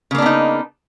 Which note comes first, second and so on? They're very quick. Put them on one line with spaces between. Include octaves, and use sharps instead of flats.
C#3 A#3 D4 B3 D#4